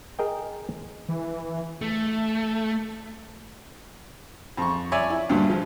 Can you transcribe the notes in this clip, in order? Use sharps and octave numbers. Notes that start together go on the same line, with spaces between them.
G#4 A#4 D#5 G5
E3
A3
F2 C#6
C#5 D5 E5 G#5 C#6
E4
D2 G2 A#2
F3